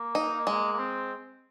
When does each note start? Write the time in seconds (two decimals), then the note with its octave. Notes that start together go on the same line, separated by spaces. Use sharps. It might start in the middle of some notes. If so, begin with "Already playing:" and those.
Already playing: A#3
0.15 D#4
0.47 G#3
0.73 A#3
0.79 C4